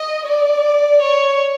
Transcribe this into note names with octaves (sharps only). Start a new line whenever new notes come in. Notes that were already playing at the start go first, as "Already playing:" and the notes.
Already playing: D#5
D5
C#5